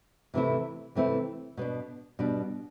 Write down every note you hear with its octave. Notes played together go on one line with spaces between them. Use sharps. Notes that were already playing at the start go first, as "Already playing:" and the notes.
C3 E3 A3 C4 E4
C3 E3 A3 C4 E4
B2 B3 D4
B2 G3 D4